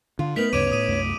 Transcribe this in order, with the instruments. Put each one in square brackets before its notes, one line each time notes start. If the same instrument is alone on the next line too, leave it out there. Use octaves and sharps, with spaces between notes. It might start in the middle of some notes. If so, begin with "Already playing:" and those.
[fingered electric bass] D3 [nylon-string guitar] F4
[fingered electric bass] A3 [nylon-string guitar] B3 D#4 [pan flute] A#4 [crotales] B6 F7 F#7
[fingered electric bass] D2 G2 C#3 [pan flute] C#5 [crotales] D6 D7 D#7
[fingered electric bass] A2 [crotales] D#6 D#7
[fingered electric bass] C2 F#2 A3